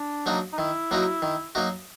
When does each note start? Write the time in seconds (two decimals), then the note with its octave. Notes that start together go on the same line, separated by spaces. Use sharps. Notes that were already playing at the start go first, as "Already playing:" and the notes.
Already playing: D4
0.26 F#3 A#3 D#4 F#4
0.53 D#4
0.58 D#3 E4
0.91 F#3 A#3 D#4 F#4
1.22 D#3
1.55 F#3 A#3 D#4 F#4